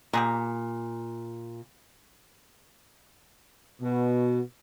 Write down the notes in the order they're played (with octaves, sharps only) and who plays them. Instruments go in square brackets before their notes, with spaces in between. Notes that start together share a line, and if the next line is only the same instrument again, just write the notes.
[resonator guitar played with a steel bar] A#2 [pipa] G4 G#4 A#5
[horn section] B2